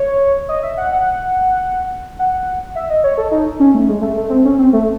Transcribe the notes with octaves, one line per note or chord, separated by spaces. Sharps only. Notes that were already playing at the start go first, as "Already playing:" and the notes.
Already playing: C#5
D#5
E5
F#5
F#5
F#5
E5
D#5
C#5
A4
D#4
C#4
A3
G#3
A3
A3
C4
C#4
C4
A3